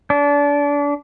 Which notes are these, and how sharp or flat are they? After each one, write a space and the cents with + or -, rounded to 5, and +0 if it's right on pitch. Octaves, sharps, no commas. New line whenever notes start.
D4 -30